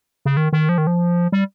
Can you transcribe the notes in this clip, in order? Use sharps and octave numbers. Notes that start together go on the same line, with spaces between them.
C#3
D#3
D#3
F3
D#3
F3
G3